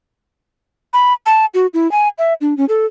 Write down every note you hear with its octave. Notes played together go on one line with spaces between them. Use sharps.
B5
A5
F#4
E4
G#5
E5
D4
C#4
A4